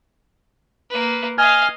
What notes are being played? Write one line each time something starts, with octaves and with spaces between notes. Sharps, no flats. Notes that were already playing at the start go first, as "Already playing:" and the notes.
A#3 B4
D#5 F5 G#5 F6